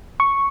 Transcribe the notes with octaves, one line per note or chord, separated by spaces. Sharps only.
C#6